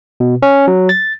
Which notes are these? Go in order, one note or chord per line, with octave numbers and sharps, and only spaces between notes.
B2
C#4
F#3
A6